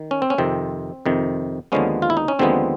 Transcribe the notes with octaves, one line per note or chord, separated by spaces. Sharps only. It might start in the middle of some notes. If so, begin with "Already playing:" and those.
Already playing: D#3
C#4
C4
C#4
F2 C3 D#3 C4
F2 C3 D#3
D#2 D3 F3 G#3 B3 C#4
F4
E4
D#4
C#4
D#2 D3 F3 G#3 B3 C4